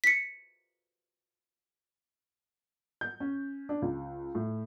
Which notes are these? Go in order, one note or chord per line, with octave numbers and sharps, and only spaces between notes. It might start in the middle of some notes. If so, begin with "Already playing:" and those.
B6 C#7
G6
C#4
D4
C#2
A2